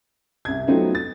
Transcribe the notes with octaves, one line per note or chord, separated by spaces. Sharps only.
C2 G#6
F#3 A3 B3 C4 D#4 F4
A6